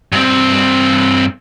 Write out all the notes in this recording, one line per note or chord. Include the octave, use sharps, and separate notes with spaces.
G2 C4